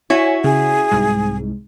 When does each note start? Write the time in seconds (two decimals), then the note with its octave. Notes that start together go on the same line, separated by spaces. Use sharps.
0.10 E4 F#4 C#5 G#5
0.44 C#3 G#4
0.91 C2 G#2